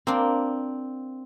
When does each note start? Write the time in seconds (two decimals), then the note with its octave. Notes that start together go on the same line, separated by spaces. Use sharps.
0.07 A#3 C4 D4 F4